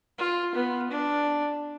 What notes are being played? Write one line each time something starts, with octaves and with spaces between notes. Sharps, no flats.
F4
B3
D4